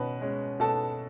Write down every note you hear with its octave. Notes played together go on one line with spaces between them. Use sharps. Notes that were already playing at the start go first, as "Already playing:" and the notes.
Already playing: B2 C#4 B4 B5
G#3 C#4
B2 A4 A5